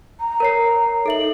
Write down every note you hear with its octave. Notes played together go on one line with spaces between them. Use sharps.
A#5
A#4 C#5 C7
D#4 A4 E5 F#7